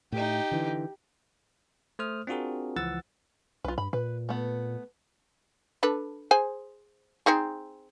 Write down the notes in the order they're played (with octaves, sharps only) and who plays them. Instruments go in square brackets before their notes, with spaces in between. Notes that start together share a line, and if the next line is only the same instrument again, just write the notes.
[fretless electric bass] A2 [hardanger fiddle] D#4 G4
[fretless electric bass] D3 E3
[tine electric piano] A3 C5 D#6 F6
C4 D4 F4 F#4 G#4 A#4
C#2 E3 F3 F#5 E6 A6
[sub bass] B1 [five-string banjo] F4 B4
[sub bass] G2 [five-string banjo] B5
[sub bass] A#2 [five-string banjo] B4
[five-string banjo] A3 B3
[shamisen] D4 A4 B4
G#4 C5 G#5
C4 D#4 G#4